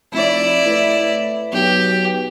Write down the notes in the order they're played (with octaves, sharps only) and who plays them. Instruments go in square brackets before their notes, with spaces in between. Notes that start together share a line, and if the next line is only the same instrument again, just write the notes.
[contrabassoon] F1 [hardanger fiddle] E4 D5
[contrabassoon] A2 [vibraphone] B4
[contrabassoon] B1 [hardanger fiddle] G4